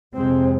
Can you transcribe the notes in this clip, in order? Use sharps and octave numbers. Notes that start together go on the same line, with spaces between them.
F2 C3 G#3 C4